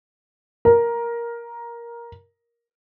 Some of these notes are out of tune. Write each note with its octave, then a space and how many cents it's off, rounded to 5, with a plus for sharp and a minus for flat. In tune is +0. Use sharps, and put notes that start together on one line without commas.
A#4 +10